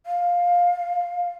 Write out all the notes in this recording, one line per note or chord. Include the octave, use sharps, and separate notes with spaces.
F5